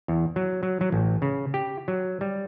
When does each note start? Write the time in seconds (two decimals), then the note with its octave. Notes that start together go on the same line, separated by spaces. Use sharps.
0.08 E2
0.36 F#3
0.63 F#3
0.81 F#3
0.92 A1
1.22 C#3
1.54 G4
1.88 F#3
2.21 G3